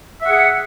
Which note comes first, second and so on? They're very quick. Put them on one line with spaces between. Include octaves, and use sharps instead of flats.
E5 F#5 G#4